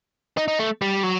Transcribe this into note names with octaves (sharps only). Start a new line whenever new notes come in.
D#4
D#4
A3
G3
F#3